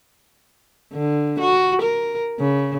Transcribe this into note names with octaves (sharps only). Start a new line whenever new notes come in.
D3
F#4
A#4
C#3